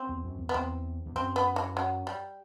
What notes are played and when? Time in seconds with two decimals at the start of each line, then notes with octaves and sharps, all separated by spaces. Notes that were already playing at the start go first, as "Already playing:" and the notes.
Already playing: C4
0.09 E2
0.24 F#2
0.39 E2
0.49 B3
0.54 E2 C4
1.06 E2
1.15 F#2 C4
1.36 B3
1.56 E3
1.77 F#3
2.07 G3